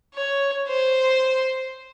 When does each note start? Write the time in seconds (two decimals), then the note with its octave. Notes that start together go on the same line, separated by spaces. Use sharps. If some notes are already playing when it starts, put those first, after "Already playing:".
0.14 C#5
0.68 C5